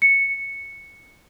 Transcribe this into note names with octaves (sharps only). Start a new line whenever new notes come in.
C#7